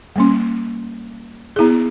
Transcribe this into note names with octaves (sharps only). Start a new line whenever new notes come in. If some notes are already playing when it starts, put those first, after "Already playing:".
G3 A#3 C#4
B3 E4 G#4